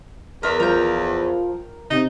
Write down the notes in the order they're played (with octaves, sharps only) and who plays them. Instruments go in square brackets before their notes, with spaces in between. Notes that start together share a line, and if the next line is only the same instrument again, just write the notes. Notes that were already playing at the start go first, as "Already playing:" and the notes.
[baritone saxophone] E2 [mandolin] A#4 E5
[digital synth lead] F3 [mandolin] A#4 G5
[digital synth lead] C3 [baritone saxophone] D#4